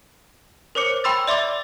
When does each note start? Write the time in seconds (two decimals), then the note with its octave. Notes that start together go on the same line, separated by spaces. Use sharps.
0.75 A#4 C5 C#5 D6 C#7
1.04 G5 B5 C6 E6 A6
1.27 D5 E5 C6 D6 A6